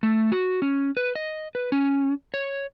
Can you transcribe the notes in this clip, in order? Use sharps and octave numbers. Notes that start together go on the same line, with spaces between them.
A3
F#4
C#4
B4
D#5
B4
C#4
C#5